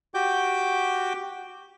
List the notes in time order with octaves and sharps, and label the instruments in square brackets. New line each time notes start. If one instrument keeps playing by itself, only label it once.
[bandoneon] F#4 G4 G5 D6 G6